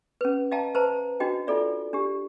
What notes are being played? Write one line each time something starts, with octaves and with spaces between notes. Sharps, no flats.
C#4 B4
D#5 F5 G5 A5 A#5
B4 C5 E5 A5 A#5
D4 D#4 F#4 D#5 G5
D4 D#4 F4 A4 D5 E5
D4 G4